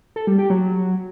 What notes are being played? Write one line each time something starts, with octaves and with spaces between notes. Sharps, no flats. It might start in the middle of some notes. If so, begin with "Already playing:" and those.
A4
G3
G4
F#3